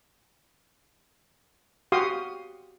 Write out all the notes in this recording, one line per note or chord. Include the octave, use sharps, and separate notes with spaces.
F#4 G4 F5 C6 D#6